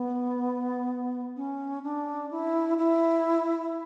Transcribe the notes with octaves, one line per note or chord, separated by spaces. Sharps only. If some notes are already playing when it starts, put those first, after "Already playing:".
Already playing: B3
C#4
D4
E4
E4